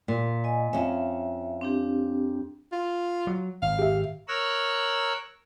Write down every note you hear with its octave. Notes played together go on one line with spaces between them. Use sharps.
A#2
D#5 G#5
F2 C#4 E5
C4 D4 G4
F4
F#3
G#1 F5
G4 E5
A#4 C#5 E6 F#6